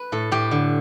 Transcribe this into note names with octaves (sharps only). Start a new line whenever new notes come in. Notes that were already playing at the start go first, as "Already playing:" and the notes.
Already playing: B4
A2 A4
A2 G4
D3